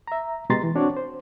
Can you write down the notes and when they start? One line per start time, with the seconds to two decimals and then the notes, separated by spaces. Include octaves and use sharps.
0.08 E5 A#5
0.50 B2 G#3 G4 A#5 C6 A6
0.63 E3
0.75 C4 D4 F#4 C#5 D5
0.97 C5